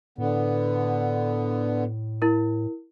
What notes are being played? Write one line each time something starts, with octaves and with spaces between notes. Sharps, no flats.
A2 D3 B3
E4 A#4